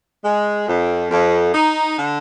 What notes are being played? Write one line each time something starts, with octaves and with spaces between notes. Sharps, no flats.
G#3
F2
F2
D#4
D3